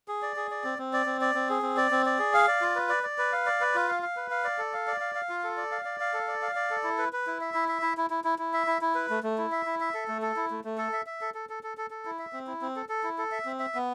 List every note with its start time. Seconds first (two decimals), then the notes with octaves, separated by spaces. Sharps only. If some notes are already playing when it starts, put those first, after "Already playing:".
0.08 G#4
0.22 D5
0.36 G#4
0.51 D5
0.64 C4
0.78 C4
0.93 D5
1.06 C4
1.21 D5
1.35 C4
1.50 G#4
1.62 C4
1.77 D5
1.91 C4
2.06 D5
2.19 G#4
2.34 F5
2.48 D5
2.61 F4
2.75 B4
2.89 D5
3.03 D5
3.18 B4
3.33 F5
3.46 D5
3.61 B4
3.75 F4
3.88 F5
4.03 F5
4.17 B4
4.31 F5
4.44 D5
4.58 A4
4.73 F5
4.87 D5
5.00 F5
5.15 F5
5.29 F4
5.44 A4
5.57 D5
5.72 F5
5.85 D5
6.00 F5
6.14 A4
6.28 D5
6.42 F5
6.55 D5
6.71 A4
6.83 E4
6.98 B4
7.13 B4
7.27 E4
7.41 E5
7.54 E4
7.69 E5
7.82 E4
7.97 E4
8.10 E4
8.24 E4
8.39 E4
8.53 E5
8.67 E4
8.81 E4
8.95 B4
9.10 A3
9.23 A3
9.38 E4
9.52 E5
9.66 E4
9.80 E5
9.94 A4
10.08 A3
10.22 A4
10.36 E4
10.51 A3
10.65 A3
10.78 A4
10.93 E5
11.06 E5
11.21 A4
11.34 A4
11.49 A4
11.63 A4
11.78 A4
11.90 A4
12.05 E4
12.19 E5
12.33 C4
12.47 E4
12.62 C4
12.76 A4
12.89 A4
13.04 E4
13.18 A4
13.32 E5
13.45 C4
13.59 E5
13.75 B3